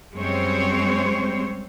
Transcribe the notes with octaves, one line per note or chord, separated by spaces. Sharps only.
F#2 G3 G#3 C4 C5 C#5